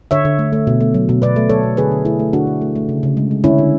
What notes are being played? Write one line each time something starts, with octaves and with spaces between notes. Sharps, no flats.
D3 C#5 E5
D3
A3
A3
B2
A3
F#3
B2
B2 B4 D5
A3
F#3 A4 C#5
B2
D3 G#4 B4
D3
A3 E4 G#4
A3
D3 D4 F#4
D3
A3
A3
C#3
C#3
G#3
G#3
D3 C#4 E4
D3